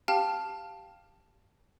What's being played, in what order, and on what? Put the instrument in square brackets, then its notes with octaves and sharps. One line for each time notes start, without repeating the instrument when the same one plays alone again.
[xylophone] G4 F5 G5 A5 F6